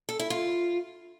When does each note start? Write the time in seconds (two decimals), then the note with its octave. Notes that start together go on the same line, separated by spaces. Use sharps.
0.09 A4
0.19 E4
0.30 F4